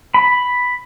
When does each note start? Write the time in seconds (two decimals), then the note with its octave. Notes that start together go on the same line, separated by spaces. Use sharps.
0.14 B5